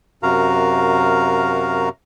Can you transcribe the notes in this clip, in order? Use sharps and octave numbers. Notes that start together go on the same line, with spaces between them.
F#2 C3 F#4 A#4 F5 A#5